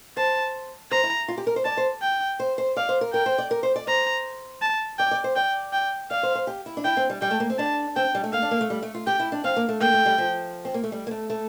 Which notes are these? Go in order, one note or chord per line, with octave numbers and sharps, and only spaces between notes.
C5 A5
C5 A#5
E4
F4
G4
A#4
C5
D5 A5
C5
G5
C5
C5
D5 F5
C5
A#4
A#4 G5
C5
D5
A#4
C5
D5
C5 A#5
A5
D5 G5
D5
C5
D5 G5
G5
D5 F5
C5
C5
G4
E4
D4
E4 G5
C4
G3
G3 G5
A3
A#3
C4
D4 A5
C4 G5
G3
A3
A#3 F5
D4
A#3
A3
G3
A3
F4
G4 G5
E4
D4
C4 F5
A#3
A3
A#3 G5
A3
G3
F3
C4
A#3
A3
G3
A#3
A3
A3